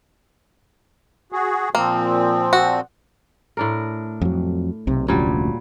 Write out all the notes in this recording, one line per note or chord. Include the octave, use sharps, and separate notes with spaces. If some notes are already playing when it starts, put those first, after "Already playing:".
F#4 G#4
A#2 F3 A#3 C4
F#4
A2 D4 A#4
F2 F#3
B1 C3
F1 D2 A#2 F#3 G3 C#4